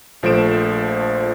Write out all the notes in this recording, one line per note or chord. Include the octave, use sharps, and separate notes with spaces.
A#1 F3 A3 C5 D7 E7